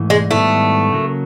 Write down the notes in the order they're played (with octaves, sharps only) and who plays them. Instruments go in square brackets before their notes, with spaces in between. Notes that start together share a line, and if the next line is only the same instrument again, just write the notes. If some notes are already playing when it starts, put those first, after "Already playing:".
Already playing: [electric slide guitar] G#2 E3 A3
[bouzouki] G#3
[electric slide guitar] G#2 D#3 G3 B3 E4 [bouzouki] A3
[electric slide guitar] C#3 F#3 A#3